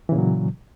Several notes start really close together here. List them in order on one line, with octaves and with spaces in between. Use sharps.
E3 C#3 A#2 F#3